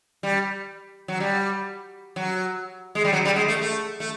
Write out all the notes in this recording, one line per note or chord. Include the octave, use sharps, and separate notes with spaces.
G3
F#3
G3
F#3
G#3
G3
F#3
G3
G#3
A3
A3
A3